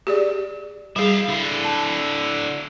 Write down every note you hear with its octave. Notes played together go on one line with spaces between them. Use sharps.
G4 G#4 D5
G3 E4 G#4 F5
D3 E4
A5